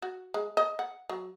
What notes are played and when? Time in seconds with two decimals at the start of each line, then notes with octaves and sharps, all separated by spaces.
0.02 F#4
0.34 G#3
0.57 D#5
0.79 F#5
1.09 F#3